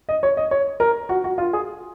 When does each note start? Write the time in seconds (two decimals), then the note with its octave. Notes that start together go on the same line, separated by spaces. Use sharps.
0.09 D#5
0.23 C#5
0.37 D#5
0.51 C#5
0.80 A#4
1.09 F#4
1.24 F#4
1.38 F4
1.53 G#4